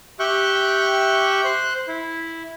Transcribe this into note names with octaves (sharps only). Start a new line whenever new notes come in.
G4 E5 G5 C#6 F#6
C5 F#6
E4